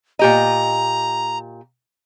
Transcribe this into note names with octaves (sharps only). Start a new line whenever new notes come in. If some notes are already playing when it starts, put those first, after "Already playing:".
A#2 G4 D#5 A#5